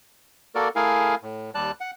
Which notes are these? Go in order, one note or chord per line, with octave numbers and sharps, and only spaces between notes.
A#3 F#4 A4 A#4 D5
A3 E4 G#4 A#4 F5 G#5
A2
D#2 G3 D5 A5 F#6
F#5